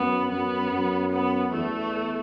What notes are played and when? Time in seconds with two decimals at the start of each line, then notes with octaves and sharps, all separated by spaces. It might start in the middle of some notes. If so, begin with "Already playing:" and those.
Already playing: F#2 B3
0.31 F#2 B3
0.71 F#2
1.11 B3
1.52 E2 A3